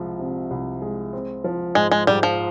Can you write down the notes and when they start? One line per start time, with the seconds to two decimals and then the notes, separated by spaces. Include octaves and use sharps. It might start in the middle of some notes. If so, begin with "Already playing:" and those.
Already playing: C2 F3 G#3
0.19 C3
0.51 C2
0.82 G#3
1.13 C4
1.44 F3
1.75 G#2 G#3
1.91 G#3
2.07 G#2 G3
2.23 F3